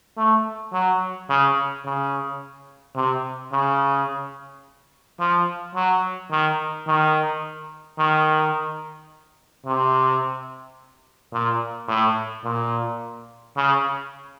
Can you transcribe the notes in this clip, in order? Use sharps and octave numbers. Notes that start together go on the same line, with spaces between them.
A3
F#3
C#3
C#3
C3
C#3
F3
F#3
D#3
D#3
D#3
C3
A#2
A2
A#2
C#3